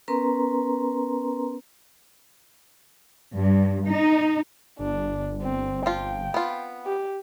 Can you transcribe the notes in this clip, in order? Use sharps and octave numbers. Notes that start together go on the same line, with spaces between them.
B3 C#4 A#4 B4 A#5 C6
G2
D#4
G1 D4
C4
F3 F4 G5
B3 F4
G4